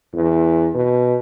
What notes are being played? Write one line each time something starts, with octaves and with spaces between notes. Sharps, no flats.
E2
B2